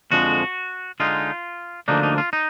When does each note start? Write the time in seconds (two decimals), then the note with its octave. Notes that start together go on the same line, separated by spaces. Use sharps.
0.11 F2 D3 F3 G#3 F#4
1.00 D3 G#3 D#4 F4
1.88 D2 D3 F3 A#3 D4 D#4
2.03 D#4
2.18 F4
2.33 D#4